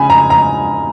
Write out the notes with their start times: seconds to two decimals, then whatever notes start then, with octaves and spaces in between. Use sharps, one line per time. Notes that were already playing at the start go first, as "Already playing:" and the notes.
Already playing: C#3 G#5 B5
0.10 A#5
0.30 A#5